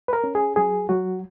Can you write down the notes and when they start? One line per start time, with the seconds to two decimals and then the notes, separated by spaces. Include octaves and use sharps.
0.08 B4
0.13 A#4
0.24 C#4
0.35 G#4
0.56 F#3 G#4
0.89 F#3 F#4